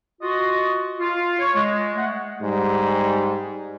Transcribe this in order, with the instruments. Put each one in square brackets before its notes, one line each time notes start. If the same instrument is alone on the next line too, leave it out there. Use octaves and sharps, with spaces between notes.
[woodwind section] F4 F#4 D#5
F4
C#5
G#3
A3 F#5
[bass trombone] G#2 [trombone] G3